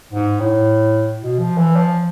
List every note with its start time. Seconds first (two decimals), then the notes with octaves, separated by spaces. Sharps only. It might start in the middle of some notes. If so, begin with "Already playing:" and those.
0.13 G#2
0.40 A2
1.22 B2
1.39 F3
1.58 E3
1.76 F3